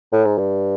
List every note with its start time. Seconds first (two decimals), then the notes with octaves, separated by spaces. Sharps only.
0.13 A2
0.25 G#2
0.38 G2